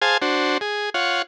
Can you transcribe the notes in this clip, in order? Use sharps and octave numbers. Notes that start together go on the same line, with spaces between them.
G#4 C5 F5 G#5 A5
D4 F#4 C5
G#4
F4 C#5 F#5